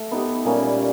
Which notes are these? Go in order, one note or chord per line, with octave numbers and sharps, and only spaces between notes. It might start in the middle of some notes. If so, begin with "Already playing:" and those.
Already playing: A3
B3 D#4 G4
A#2 G3 A#3 C#4